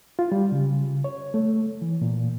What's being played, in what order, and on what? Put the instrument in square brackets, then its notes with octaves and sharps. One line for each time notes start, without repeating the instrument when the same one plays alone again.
[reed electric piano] F4
G3
C#3
C#5
A3
E3
A#2